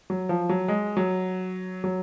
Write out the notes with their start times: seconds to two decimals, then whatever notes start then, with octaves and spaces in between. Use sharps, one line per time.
0.10 F#3
0.29 F3
0.49 F#3
0.68 G#3
0.97 F#3
1.84 F#3